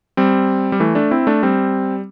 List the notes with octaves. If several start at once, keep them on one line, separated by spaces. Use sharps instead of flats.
G3 C4
G3
E3 A3
A3 D4
C4 E4
A3 D4
G3 C4